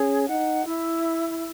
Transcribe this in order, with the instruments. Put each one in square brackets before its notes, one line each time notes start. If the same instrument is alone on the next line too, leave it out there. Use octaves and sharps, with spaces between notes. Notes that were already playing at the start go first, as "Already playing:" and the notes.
Already playing: [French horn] C#4 [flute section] G#4
[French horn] D#4 [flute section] F#5
[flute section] E4